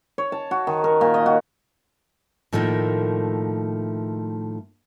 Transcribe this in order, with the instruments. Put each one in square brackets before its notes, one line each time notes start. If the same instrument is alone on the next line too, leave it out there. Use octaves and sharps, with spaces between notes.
[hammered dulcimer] C#5
A5
F#4
D#3
A#4
A#2
D#5
F#4
[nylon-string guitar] A2 D#3 F3 A3 A#3